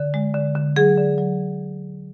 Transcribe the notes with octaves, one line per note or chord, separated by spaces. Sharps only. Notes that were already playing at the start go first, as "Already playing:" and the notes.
Already playing: D3
G#3
D3
D3
F#3 G#4
D3
F#3